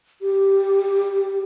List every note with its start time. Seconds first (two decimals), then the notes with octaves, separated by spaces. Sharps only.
0.22 G4